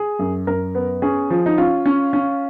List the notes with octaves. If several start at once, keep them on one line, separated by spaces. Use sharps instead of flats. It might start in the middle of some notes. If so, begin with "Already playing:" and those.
Already playing: G#4
F#2
F#2 A#4
B3
C#4 G#4
F3
D#4
C#4 F4
C#4
C#4